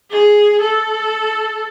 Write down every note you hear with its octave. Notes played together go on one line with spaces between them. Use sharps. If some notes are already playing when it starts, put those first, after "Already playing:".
G#4
A4